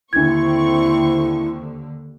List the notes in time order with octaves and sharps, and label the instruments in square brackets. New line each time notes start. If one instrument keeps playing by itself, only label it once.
[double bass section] D#2 D3 [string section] C4 C#6 [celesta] D4 G#6 [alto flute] E4